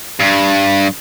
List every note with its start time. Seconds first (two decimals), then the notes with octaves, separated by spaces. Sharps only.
0.20 G2